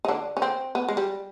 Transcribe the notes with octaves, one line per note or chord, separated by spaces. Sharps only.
D#4
D3 D4
C#4
C4
B3
G#3
G3